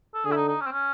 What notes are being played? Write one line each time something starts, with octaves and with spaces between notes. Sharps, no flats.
A4
D3 G#4
E4
D#4
D#4
C#4
C4
C#4